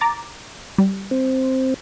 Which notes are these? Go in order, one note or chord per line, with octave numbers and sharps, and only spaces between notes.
A#5 D6 A6
G3
C4